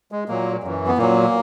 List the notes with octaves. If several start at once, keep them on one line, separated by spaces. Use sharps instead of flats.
G#3
A#2 F#3 A#3
F#2 E3
B3
A#2 F#3 A#3